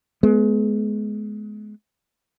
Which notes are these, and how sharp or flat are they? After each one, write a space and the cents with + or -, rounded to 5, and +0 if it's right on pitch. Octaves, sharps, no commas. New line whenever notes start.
G#3 +30 B3 +0